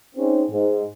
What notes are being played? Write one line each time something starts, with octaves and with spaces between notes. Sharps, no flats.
C4 C#4 D#4 G#4
G#2